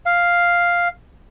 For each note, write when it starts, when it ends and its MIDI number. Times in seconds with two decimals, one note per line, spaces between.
0.06 0.88 77